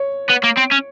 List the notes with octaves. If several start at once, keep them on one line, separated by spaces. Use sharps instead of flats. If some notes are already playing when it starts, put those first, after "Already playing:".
Already playing: C#5
B3
A#3
C4
C#4